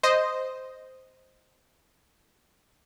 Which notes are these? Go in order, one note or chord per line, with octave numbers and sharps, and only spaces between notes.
C5 D#5